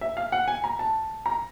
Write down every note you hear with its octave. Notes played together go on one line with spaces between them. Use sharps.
E5
F5
F#5
G#5
A#5
A5
A#5